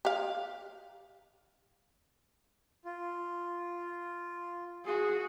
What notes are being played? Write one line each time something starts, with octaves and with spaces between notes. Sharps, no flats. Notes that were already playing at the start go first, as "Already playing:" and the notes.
G4 F5
F4
F#4 G#4